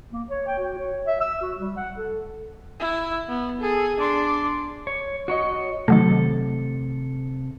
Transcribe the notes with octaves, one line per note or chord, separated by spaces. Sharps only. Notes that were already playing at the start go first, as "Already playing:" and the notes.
A#3
C#5
G5
F#4
C#5
E5
E6
F#4
G3
F#5
A4
E4
B3
G#4 A4
D4 C6 D6
C#5
F#4 C#5 D#5
C3 D#3 F#3 A3 A4